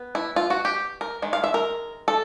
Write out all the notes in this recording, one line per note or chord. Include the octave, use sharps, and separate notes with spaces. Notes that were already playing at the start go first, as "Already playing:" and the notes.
Already playing: B3
E4
F4
F#4
G4
A#4
D#3 G#3
F5
E5
A#4
A4